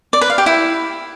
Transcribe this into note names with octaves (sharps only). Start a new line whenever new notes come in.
D5
B4
F5
G4
E4